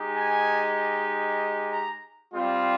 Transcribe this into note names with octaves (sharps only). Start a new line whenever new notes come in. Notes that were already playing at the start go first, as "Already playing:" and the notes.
Already playing: G#3 D#4 G4
G#5
A#5
G3 C4 F4